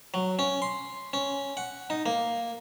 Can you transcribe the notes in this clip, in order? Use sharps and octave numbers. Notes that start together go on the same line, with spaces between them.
F#3
C#4
C6
C#4
F#5
D#4
A#3